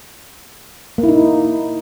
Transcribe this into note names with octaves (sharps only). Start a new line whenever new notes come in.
A#3
E4
D#4